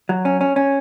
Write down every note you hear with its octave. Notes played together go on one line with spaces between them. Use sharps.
F#3
C#4
C#4
C#4